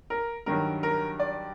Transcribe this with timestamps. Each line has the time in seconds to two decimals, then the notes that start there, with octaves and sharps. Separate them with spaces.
0.10 A#4
0.46 G2 D#3 F#3 A#4
0.83 A#4
1.20 D5